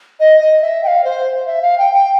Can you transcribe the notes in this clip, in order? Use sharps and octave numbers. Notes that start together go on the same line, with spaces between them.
D#5
D#5
E5
G5
F5
C5
E5
F5
G5
G5